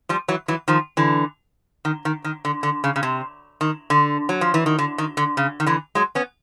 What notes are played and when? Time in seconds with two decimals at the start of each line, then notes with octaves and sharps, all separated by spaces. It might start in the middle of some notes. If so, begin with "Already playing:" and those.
0.09 F3 G3
0.28 E3 F#3
0.48 E3 F#3
0.68 D#3 F3
0.97 D3 E3
1.85 D#3
2.05 D#3
2.24 D#3
2.45 D3
2.63 D3
2.84 C#3
2.96 C#3
3.03 C3
3.61 D#3
3.90 D3
4.29 F#3
4.41 F3
4.54 E3
4.66 D#3
4.79 D3
4.98 D#3
5.17 D3
5.37 C#3
5.60 D#3
5.66 D3 E3
5.95 F#3 G#3
6.15 B3 C#4